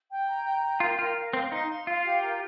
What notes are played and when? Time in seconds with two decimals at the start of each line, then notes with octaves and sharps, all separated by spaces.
0.10 G5
0.28 A#5
0.45 A#5
0.63 G5
0.80 F4 A#4
0.99 F4 A#4
1.16 F5
1.33 C4 F5
1.52 D#4 C6
1.69 F5
1.87 F4 F5
2.04 G4
2.22 A#4